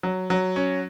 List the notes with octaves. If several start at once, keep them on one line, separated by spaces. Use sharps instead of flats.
F#3
F#3
C#4